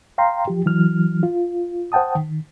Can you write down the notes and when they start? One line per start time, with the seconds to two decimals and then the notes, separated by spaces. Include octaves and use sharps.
0.18 F5 G5 A#5 C6
0.48 F3 G4
0.66 E3 F#3 F6
1.23 F4
1.92 C5 F#5 G5 A5 D#6
2.15 D#3